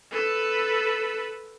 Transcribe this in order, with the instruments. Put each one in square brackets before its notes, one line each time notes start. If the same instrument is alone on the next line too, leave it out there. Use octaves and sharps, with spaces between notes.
[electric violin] A4 B4